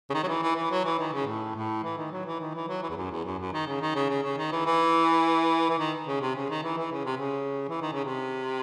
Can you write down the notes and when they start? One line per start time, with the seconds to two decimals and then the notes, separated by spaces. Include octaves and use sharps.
0.10 C#3
0.14 D#3
0.23 F#3
0.28 E3
0.43 E3
0.56 E3
0.71 F#3
0.85 E3
0.99 D#3
1.13 C#3
1.27 A2
1.55 A2
1.83 E3
1.97 D#3
2.12 F#3
2.26 E3
2.40 D#3
2.54 E3
2.68 F#3
2.82 E3
2.90 E2
2.97 F#2
3.11 E2
3.25 F#2
3.39 F#2
3.53 D#3
3.67 C#3
3.81 D#3
3.95 C#3
4.09 C#3
4.23 C#3
4.37 D#3
4.52 E3
4.66 E3
5.70 E3
5.79 D#3
6.07 C#3
6.21 C3
6.36 C#3
6.50 D#3
6.63 E3
6.77 E3
6.92 C#3
7.05 C3
7.17 C#3
7.69 E3
7.81 D#3
7.93 C#3
8.05 C3